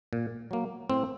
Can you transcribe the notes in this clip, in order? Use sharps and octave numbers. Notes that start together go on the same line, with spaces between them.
A#2
F#3 A#3
A2 C4